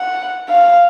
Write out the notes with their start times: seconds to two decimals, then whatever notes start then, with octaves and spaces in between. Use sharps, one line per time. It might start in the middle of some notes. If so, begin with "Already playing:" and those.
Already playing: F#5
0.49 F5